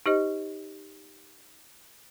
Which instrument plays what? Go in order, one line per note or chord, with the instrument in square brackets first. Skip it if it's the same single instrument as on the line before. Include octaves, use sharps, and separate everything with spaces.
[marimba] D#4 G4 C5 D#5